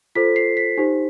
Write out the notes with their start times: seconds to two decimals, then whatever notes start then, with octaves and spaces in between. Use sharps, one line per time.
0.15 F4 A4 C5 B6
0.36 C7
0.57 B6
0.77 D#4 G4 C5